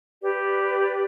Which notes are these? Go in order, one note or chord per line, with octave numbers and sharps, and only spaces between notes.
G4 B4 D5